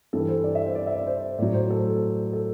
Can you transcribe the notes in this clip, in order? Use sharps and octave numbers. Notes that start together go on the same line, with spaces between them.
G2 E3 G3 A4
C5
D5
E5
C5
D5
E5
D5
C5
A2 F#3 D5
C5
A4
A4